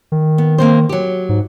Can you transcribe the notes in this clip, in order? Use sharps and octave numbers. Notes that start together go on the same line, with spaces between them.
D#3
B3
A#3 C4 C5
F#3 G4
G#2